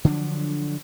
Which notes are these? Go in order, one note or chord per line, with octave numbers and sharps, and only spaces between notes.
D3 F3 F#3 D4